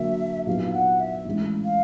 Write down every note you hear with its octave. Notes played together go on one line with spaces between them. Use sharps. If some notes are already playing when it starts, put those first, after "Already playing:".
Already playing: D3 F#3 A#3 D4 E5
A#2 F#3 B3 D#4 F5
F#5
E5
A2 E3 G#3 C#4
F5